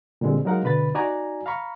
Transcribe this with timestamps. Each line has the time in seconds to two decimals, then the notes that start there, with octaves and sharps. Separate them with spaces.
0.21 A#2 D3 G3 G#3 C4
0.45 F#3 G#3 D#4 A#4 F5 F#5
0.63 B2 D3 B4 B5 A6
0.95 D#4 F#4 D5 G#5 A#5
1.46 F5 A#5 B5 C#6